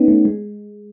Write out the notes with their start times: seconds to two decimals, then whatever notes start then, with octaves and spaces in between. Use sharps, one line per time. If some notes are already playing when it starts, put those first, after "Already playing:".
Already playing: B3 C#4 D#4
0.08 A3
0.25 G#3